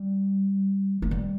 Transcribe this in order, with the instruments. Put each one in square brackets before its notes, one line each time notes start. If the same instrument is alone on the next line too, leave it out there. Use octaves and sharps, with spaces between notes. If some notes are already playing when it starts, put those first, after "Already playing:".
Already playing: [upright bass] G3
A3
G3